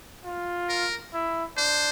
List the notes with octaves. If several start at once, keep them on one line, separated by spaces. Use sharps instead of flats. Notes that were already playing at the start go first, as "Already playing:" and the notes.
F4
A#4
E4
D4 C5